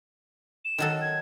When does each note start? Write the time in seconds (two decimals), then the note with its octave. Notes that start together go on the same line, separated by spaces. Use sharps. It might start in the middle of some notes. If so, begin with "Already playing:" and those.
0.65 E7
0.78 D#3 F#3 A4
1.01 G#6